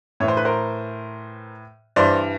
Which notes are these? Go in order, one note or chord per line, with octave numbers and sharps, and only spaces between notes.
A2 E3 C#5
C5
B4
A#4 C5
G2 E3 C5 D5